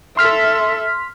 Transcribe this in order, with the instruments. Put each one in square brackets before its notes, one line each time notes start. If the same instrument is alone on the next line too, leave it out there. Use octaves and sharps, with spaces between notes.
[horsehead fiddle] A4 E5 [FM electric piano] C6 F6 B6